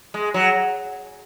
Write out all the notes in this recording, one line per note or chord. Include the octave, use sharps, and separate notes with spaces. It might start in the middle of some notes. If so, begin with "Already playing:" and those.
G#3
F#3